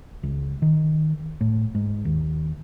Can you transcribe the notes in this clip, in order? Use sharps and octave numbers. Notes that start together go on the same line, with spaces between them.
C#2
D#3
A2
G#2
D#2